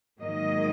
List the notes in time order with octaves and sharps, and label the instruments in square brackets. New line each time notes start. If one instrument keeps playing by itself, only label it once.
[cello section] G#2 D#3 F#3 A#3 D#5